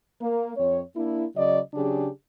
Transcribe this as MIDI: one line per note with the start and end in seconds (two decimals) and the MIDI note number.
0.21 0.51 58
0.57 0.80 41
0.57 0.80 60
0.57 0.80 73
0.95 1.25 58
0.95 1.25 62
0.95 1.25 64
1.35 1.59 49
1.35 1.59 54
1.35 1.59 74
1.35 1.59 75
1.74 2.08 49
1.74 2.08 54
1.74 2.08 62
1.74 2.08 67
1.74 2.08 68